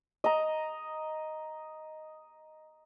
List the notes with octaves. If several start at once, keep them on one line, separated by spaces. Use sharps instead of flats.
D#5 A#5